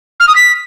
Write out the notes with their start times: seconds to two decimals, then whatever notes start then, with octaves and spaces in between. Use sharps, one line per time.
0.20 F6
0.28 D#6
0.36 B6